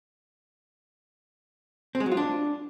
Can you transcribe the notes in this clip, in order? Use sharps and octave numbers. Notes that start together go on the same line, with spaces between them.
C4
G#3
F#3
F4
D4